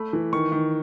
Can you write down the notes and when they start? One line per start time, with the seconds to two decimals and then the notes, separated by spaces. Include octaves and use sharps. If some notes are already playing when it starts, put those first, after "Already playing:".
Already playing: A3 B5
0.13 E3
0.33 D#3 C#6
0.52 D#3